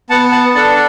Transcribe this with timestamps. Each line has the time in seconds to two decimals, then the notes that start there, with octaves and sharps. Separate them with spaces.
0.10 B3 F#5 A5
0.32 F#5 A5
0.55 D4 A4 F#5 A5